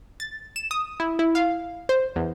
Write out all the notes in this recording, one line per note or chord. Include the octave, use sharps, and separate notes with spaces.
A6
E7
D#6
E4
E4
F5
C5
E2